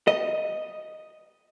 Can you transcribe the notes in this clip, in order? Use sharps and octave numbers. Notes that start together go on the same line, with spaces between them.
D#5